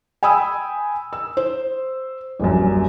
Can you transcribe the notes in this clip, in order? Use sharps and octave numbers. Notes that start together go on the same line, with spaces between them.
G5 G#5 B5 D#6 E6
E6
C5
D#1 A#1 F#2